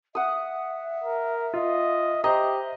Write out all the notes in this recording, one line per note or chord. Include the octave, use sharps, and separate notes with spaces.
E5 F#5 D#6
A#4
F4 D#5
G4 C5 D#5 A#5